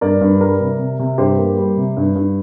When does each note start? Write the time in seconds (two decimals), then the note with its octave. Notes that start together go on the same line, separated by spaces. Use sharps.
0.01 G2 A#4 D5
0.21 G2
0.40 G3 A#4 D5
0.61 C3
0.79 C3
0.99 C3
1.18 G2 G4 C5
1.38 A#3
1.57 G3
1.77 C3
1.97 G2
2.15 G2